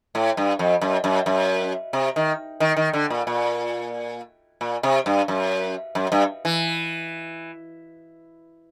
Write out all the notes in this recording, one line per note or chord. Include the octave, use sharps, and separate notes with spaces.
A2
G2
F2
F#2
F#2
F#2
C3
D#3
D#3
D#3
D3
A#2
A#2
A#2
C3
G2
F#2
F#2
G2
E3